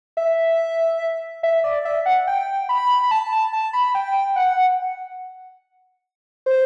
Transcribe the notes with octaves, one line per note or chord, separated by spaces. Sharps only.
E5
E5
D5
E5
F#5
G5
B5
B5
A5
A5
A5
B5
G5
F#5
C5